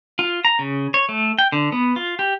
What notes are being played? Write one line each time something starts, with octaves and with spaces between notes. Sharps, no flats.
F4
A#5
C#3
C#5
A3
G5
D3
B3
F4
G4